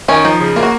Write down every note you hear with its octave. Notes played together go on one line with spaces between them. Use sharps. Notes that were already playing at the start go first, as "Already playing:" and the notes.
D#3 C#4
F3 D#4
C#3
A#3 F4
F#4